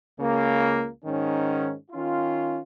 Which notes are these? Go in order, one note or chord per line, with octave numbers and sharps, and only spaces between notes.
C#2 C#3 A#3
G#2 D#3 C#4
D#3 C#4 F4